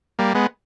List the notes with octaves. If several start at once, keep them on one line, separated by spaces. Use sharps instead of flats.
G3 A#3
G#3 B3